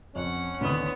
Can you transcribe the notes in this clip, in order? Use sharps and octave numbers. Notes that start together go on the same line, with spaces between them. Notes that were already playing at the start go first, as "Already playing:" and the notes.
F2 C#4 F#5
D2 D3 D#3 B3 D#6